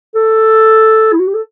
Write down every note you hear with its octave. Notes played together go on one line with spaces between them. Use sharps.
A4
E4
F#4
G4
A4